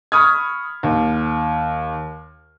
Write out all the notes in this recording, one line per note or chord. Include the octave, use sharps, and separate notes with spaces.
B5 C#6 D#6 F6 G#6
D#2